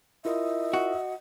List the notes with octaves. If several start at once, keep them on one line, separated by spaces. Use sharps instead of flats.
E4 F4 A#4 D#5 E5
F#4